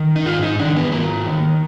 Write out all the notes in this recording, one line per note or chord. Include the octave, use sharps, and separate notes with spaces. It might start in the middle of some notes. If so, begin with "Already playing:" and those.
Already playing: D#3
D#4
G#2 F4
D#4
D#3 D4
B3
G#2 A#3
D#3